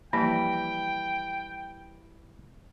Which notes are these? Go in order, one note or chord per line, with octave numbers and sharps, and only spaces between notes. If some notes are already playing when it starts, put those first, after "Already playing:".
E3 F3 G3 A#3 G5 A5 B5